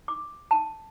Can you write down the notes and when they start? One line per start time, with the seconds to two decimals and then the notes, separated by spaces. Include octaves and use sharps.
0.08 D6
0.51 A5